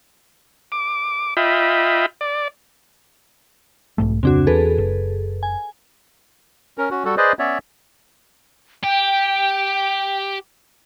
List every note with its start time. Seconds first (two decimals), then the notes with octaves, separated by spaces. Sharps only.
0.72 D6
1.37 F4 D#5 E5 G5 B5
2.21 D5
3.98 B1 G#2 A3
4.23 D1 F2 C#3 C4 D4 F#4
4.47 E2 G#4 A4 B4
4.78 F#1
5.43 G#5
6.78 C#4 A#4
6.91 C#4 F#4
7.05 G3 F#4 A4
7.17 G#4 B4 C5 D5 D#5
7.39 B3 C#4 C#5 D5 E5
8.84 G4 G5